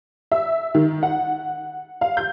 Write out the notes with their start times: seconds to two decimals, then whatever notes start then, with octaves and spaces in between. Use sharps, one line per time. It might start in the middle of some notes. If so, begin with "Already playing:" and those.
0.32 E5
0.75 D#3
1.03 F#5
2.01 F5
2.17 G6